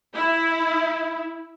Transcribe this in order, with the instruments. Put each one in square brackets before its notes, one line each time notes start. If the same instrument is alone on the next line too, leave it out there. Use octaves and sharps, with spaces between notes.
[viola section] E4